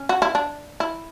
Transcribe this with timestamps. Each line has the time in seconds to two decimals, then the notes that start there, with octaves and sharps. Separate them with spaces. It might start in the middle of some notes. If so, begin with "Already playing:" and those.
Already playing: C#4
0.09 F#4
0.22 E4
0.35 D4
0.80 E4